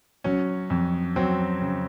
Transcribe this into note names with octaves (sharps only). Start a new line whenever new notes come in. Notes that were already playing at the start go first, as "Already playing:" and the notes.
F#3 C#4
F2
F#3 C4
C#3